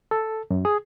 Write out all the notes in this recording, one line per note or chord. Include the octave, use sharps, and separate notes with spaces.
A4
F#2
G#4